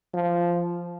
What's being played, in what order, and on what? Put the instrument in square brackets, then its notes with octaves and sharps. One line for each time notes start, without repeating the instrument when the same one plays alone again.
[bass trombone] F3